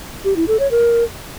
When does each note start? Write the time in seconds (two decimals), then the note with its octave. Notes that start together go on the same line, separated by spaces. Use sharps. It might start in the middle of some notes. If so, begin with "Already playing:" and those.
0.25 G4
0.36 E4
0.48 A4
0.59 C#5
0.71 A#4